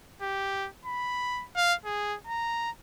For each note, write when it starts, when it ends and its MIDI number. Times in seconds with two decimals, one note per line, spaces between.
0.22 0.69 67
0.85 1.45 83
1.56 1.74 77
1.85 2.16 68
2.27 2.71 82